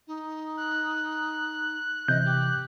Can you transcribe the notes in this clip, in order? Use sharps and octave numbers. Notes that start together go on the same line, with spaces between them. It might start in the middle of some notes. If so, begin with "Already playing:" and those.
D#4
F#6
C3 E3 D#5 G6
G4